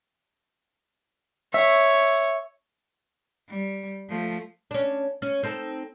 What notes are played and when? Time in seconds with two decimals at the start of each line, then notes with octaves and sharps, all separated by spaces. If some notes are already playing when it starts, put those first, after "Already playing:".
1.54 C#5 E5
3.49 G3
4.09 F3 A3
4.71 C#4 D4
5.22 C#4
5.43 C4 D#4 A4